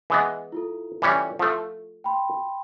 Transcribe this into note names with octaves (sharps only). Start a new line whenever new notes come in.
E3 G#3 B3
E4 F4 A4
E3 G3 C#4
F3 A3
G5 B5 C6